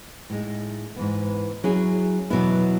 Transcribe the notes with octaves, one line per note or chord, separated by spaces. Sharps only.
A2 G#3 D#4
G#2 E3 B3
F#3 C#4 E4 G#4
E2 B2 F#3 B3 E4